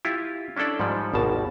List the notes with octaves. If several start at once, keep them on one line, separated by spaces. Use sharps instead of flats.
E4 F4 G4
C#4 D4 E4 A4 D5
G#2 F3 G3
G#1 D#2 B2 A#4 A5